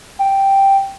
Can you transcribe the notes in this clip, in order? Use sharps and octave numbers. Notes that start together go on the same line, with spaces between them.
G5